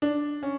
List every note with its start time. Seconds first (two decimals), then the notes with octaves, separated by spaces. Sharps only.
0.02 D4
0.43 C#4